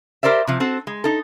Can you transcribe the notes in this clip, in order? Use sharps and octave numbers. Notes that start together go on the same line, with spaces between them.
G4 A#4 C5 D5 E5
C3 F3
C4 F#4 A4
G#3
D#4 A4